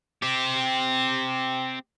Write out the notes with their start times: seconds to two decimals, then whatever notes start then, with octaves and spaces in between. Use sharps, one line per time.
0.22 C4 G4